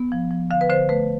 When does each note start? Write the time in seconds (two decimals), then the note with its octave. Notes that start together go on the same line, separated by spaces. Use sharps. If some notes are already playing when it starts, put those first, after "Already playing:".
Already playing: B3
0.12 F3
0.31 F3
0.51 D3 F5
0.61 B4
0.70 D3 C5
0.89 A3 B4